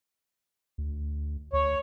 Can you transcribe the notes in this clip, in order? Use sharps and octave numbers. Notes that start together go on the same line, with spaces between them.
D2
D2 C#5